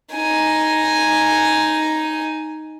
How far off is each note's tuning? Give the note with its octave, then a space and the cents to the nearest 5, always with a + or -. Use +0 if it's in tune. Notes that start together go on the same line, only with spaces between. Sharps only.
D#4 +0 G#5 +0